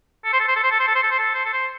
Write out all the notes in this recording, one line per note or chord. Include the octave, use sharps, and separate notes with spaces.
A4
C5
A4
C5
A4
C5
A4
C5
A4
C5
A4
C5
A4
C5
A4
C5